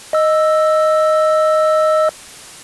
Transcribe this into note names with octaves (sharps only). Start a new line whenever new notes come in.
D#5 E6